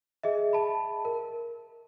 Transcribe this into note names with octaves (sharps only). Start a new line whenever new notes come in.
G#4 D#5 E5
A5 B5
A#4